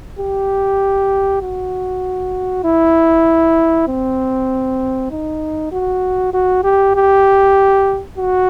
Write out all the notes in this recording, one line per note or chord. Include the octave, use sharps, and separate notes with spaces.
G4
F#4
E4
C4
D#4
F#4
F#4
G4
G4
F#4